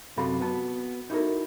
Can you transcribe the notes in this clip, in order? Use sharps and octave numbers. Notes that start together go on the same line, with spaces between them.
F#2 C3 F#4 A4 F5 B5
B3 F#4 A5
D#4 E4 F#4 G4 A4 A#4